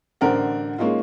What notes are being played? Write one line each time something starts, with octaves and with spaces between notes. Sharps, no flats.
A1 D3 A#4 C5 D5 F#5
G#3 A#3 C#4 D#4 F4